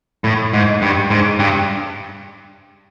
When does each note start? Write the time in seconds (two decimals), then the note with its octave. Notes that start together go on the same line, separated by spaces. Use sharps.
0.24 A2
0.53 G#2
0.82 G2
1.10 G#2
1.40 G2